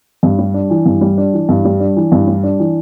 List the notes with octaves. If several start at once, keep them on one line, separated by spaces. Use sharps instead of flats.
G2
G3
D4
E3
G2
G3
D4
E3
G2
G3
D4
E3
G2
G3
D4
E3